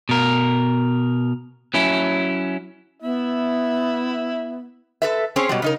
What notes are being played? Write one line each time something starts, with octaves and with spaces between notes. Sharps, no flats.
B2 A#4
F#3 C#4 E4
B3 E4 E5
A4 B4 E5
C4 C#4 G#4 C5 C#5
B2 F#3 G3
C#3 D#4 A#4